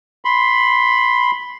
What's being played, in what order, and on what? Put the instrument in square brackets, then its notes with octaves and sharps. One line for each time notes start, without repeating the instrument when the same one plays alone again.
[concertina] B5 C6